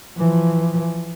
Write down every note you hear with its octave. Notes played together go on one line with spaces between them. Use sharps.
E3 F3